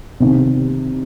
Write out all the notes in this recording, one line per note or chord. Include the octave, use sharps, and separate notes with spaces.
C2 C3 D#3